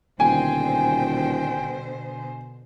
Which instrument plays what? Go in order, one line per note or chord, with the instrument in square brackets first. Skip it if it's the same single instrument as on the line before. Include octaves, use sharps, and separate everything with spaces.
[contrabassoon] D#1 [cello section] B2 D3 C5 [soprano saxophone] G5 [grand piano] G#5